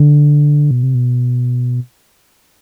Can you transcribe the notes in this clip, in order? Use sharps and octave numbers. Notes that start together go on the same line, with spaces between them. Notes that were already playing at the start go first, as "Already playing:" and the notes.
Already playing: D3
B2
C3
B2